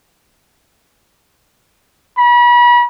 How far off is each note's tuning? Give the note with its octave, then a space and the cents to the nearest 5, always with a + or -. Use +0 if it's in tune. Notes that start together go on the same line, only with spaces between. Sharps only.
B5 -35